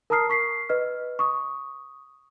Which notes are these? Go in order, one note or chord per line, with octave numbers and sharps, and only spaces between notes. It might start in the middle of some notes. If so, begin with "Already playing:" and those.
A#4 A5 A#5 D#6 F6 C7
C#6 B6 C7
B4 D#5 F6
C#6 D#6